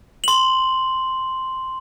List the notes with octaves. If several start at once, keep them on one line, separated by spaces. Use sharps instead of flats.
C6 F#7